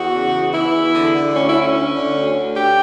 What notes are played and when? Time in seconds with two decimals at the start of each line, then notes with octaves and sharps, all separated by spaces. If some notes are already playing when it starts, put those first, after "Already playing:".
Already playing: E2 F#4
0.13 C#3
0.34 E2
0.53 E3 E4
0.74 E2
0.94 D3
1.14 D3
1.34 D2 C#4
1.48 E4
1.54 D2
1.61 C#4
1.74 D3
1.95 D3
2.15 D2
2.35 D2
2.55 D3 G4